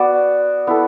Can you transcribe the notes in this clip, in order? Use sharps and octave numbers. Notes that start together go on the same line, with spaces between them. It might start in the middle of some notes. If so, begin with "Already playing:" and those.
Already playing: B3 F#4 D5
B3 E4 A4